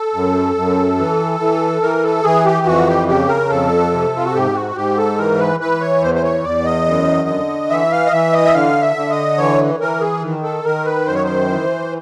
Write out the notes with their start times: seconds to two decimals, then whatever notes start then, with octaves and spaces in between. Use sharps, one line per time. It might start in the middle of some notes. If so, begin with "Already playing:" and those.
Already playing: A4
0.14 F#2
0.56 F#2
0.98 E3
1.40 E3
1.82 E3 A#4
2.04 A4
2.23 E3 G#4
2.45 G4
2.66 F2 F#4
2.87 G4
3.08 C#3 G4
3.29 A#4
3.50 F2 A4
3.92 C3
4.16 F4
4.25 F#4
4.34 G#2 G4
4.55 F#4
4.75 G#2 G4
4.97 A4
5.18 E3 A#4
5.39 B4
5.60 E3 B4
5.81 C#5
6.02 E2 C5
6.15 C5
6.23 C#5
6.44 E2 D5
6.65 D#5
6.86 F#2
7.28 D3
7.70 E3 E5
7.91 F5
8.06 D#5
8.12 E3 E5
8.33 D#5
8.45 E5
8.54 D3 F5
8.82 E5
8.96 D3
9.10 D#5
9.38 E3 C#5
9.80 E3 A#4
10.01 G#4
10.22 D#3
10.43 A4
10.64 D#3 A#4
10.85 B4
11.06 F#2 C5
11.15 C#5
11.24 C5
11.48 E3